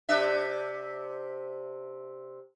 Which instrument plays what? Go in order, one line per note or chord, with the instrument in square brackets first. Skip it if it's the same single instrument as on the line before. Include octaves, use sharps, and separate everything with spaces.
[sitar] C3 D4 E5